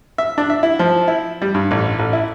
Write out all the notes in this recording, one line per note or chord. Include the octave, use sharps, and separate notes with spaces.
E5
D4
E5
E4
F3
E4
G3
G2
A1
A1
E4